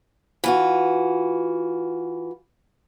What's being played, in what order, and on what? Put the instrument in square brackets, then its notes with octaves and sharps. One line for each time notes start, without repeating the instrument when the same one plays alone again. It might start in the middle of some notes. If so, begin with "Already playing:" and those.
[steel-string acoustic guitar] E3 F4 F#4